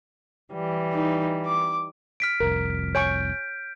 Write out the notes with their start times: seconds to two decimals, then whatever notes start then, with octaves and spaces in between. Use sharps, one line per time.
0.53 E3 G3
0.93 D#4
1.46 D6
2.20 F6 B6 D7
2.40 F1 C2 F2 A#4
2.95 C#5 G#5 C#6 G6 D7